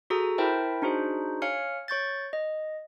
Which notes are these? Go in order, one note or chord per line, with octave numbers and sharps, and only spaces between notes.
F#4 G#4 A4 A#5 D#6
E4 A#4 C5 E5 G5 A5
D4 D#4 F#4 G#4 C5
C#5 F5 G#5 F6 C#7
C#5 C#6 G6 A6
D#5